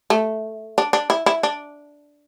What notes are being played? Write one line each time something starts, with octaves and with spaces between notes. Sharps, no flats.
A3
D4
D4
E4
E4
D4